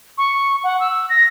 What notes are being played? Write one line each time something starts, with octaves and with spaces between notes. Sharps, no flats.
C#6
F#5
E6
A#6